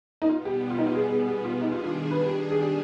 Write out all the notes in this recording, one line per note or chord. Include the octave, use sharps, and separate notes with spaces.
D#4
B2 G3 B3 F4
G4
F4
D#4
F4
G#4
G#4
G#4
F4
D#3 G3 D4 D#4 G#4
F4
F4
B4
G4
G#4
G4